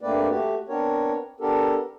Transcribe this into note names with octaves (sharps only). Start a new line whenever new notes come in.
G2 A3 A#3 C4 B4 D5
A3 F#4 G4
B3 C4 D4 A#4 C#5
B3 D4 G4 A4 A#4